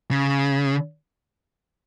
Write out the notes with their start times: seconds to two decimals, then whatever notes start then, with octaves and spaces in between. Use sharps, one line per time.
0.11 C#3